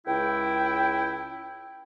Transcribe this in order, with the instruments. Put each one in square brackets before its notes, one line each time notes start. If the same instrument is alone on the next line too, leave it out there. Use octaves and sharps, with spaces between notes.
[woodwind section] C#2 E4 G5